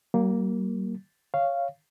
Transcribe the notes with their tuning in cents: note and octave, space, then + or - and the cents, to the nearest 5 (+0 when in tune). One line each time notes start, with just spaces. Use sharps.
G3 -45 A#3 +0
C#5 +0 F5 -10